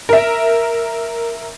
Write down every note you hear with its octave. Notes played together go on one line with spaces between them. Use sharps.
A#4 E5